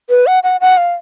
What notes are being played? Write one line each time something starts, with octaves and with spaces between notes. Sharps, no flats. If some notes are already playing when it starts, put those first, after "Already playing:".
B4
F#5
F#5
F#5
F5